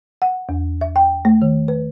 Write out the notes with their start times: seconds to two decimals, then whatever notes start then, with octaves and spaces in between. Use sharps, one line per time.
0.22 F#5
0.49 E2
0.81 E5
0.96 G5
1.25 A3
1.42 D#3
1.68 B4